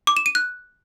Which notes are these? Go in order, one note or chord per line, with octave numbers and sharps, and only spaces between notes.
D6
E7
D#7
F#6